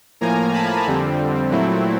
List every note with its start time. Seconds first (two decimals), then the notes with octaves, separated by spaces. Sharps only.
0.21 A2 F3 A#3 G#5 A#5
0.53 A5 B5
0.86 F2 D3 G3 C4
1.50 A#2 F#3 A3 C4 E4